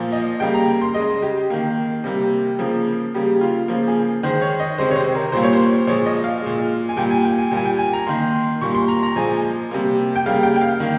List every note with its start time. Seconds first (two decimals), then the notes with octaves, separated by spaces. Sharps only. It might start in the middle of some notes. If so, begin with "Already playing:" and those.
Already playing: A#2 F3 A#3
0.12 D#5
0.40 C#3 G3 A#3 G5
0.54 A#5
0.82 C6
0.94 C#3 G#3 D#5
1.22 G4
1.50 D#3 A#3
2.04 C3 G3 A#3
2.59 C#3 F3 A#3
3.14 C#3 G3 A#3 G4
3.41 F4
3.68 C#3 F3 A#3
3.88 G#4
4.23 D#3 G#3 C5
4.41 C#5
4.60 D#5
4.78 C3 D#3 G#3 C5
4.91 C#5
4.96 C5
5.15 A#4
5.32 A#2 G3 A#3 C5
5.43 C#5
5.53 C5
5.87 A#2 F3 G#3 C#5
6.06 D#5
6.24 F5
6.42 A#2 G#3
6.89 G#5
6.97 A#2 G3 A#3 G5
7.10 G#5
7.25 G5
7.38 G#5
7.51 A#2 G3 A#3 G#5
7.65 G5
7.79 G#5
7.93 A#5
8.07 D#3 A#3 C6
8.61 A#2 G3 A#3 C#6
8.75 C6
8.88 A#5
9.03 A#5
9.16 A#2 F3 G#3 G#5
9.71 C3 G3 A#3
10.16 G5
10.26 C#3 G3 A#3 F5
10.43 G5
10.56 G5
10.61 F5
10.80 D#3 A#3